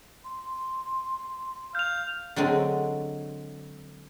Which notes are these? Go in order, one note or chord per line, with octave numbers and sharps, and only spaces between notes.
C6
F5 G6 F7
D3 F#3 G#3 C4